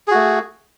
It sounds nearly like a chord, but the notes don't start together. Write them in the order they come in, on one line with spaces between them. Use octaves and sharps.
G#4 F#4 A3